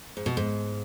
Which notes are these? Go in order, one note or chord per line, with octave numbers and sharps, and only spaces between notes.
G#2
B2
G#2